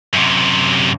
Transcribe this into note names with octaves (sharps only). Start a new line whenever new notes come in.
F#2 C3